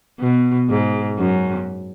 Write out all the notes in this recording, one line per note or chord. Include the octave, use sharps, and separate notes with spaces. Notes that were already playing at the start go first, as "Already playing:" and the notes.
B2
G#2
F#2